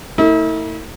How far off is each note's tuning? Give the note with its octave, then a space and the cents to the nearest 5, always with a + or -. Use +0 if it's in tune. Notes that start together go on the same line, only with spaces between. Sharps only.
A3 +45 E4 -40